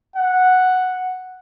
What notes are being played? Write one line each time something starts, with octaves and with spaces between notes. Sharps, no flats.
F#5